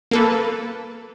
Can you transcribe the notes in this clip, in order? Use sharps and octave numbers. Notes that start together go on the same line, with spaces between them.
A#3 A4 B4